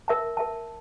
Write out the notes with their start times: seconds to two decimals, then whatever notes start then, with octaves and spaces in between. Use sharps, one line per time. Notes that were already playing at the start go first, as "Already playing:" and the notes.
0.08 A#4 E5 A5
0.37 A#4 E5 A5